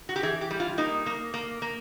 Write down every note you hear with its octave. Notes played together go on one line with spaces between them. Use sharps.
F#4
G4
E3 G#4
G4
G3
F4
A#3 D#4
A#3
A#3
A#3